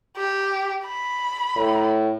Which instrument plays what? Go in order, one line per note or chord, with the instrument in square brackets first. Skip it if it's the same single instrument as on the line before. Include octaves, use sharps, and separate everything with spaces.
[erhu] G4
B5
[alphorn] A2